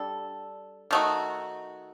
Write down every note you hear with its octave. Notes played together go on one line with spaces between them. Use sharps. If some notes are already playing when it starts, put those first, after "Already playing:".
Already playing: G3 D4 A4
D#3 A3 D#4 F#4